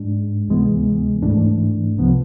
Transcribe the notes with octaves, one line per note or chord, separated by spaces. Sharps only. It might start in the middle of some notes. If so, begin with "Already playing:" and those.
Already playing: G#2 G#3 D4
D2 C3 E3 G#3 B3
G#2 E3 A3 D4
C2 C3 F3 B3